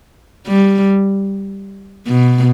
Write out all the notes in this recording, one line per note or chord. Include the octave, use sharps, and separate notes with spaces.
G3
B2